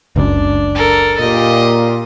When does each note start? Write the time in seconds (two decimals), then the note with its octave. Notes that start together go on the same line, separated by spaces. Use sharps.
0.16 F#1 C#2 F#2 D4
0.75 A4 A#4
1.20 A#2 F4 G4 D#5